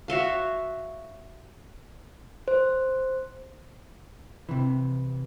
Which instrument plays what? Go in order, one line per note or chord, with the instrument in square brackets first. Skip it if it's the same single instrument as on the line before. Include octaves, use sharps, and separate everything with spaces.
[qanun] F#4 C#5 E5 F5
[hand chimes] C5
[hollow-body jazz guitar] C3 E3